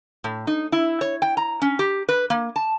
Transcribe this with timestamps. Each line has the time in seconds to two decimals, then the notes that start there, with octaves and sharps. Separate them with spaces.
0.24 A2
0.47 D#4
0.72 E4
1.01 C#5
1.22 G5
1.37 A#5
1.62 C#4
1.79 G4
2.09 B4
2.30 A#3
2.56 A5